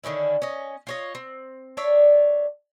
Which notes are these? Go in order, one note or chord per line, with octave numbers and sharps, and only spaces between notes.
D3 D#3 C#4 E4
C#4 D#5
F4 C#5 D#5
C4
D4 C#5 D5 E5